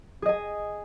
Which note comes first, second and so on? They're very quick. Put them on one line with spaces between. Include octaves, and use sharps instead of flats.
G#4 D#5 G#5